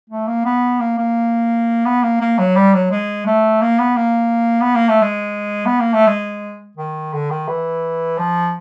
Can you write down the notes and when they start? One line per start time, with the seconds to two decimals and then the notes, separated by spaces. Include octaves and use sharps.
0.10 A3
0.27 A#3
0.45 B3
0.80 A#3
0.98 A#3
1.85 B3
2.03 A#3
2.20 A#3
2.38 F#3
2.55 G3
2.74 F#3
2.91 G#3
3.26 A3
3.61 A#3
3.79 B3
3.96 A#3
4.61 B3
4.75 A#3
4.88 A3
5.02 G#3
5.66 B3
5.80 A#3
5.93 A3
6.07 G#3
6.77 D#3
7.13 D3
7.30 D#3
7.48 E3
8.18 F3